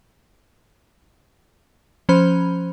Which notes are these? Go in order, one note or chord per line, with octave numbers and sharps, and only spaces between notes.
F3 C#4 C5 B5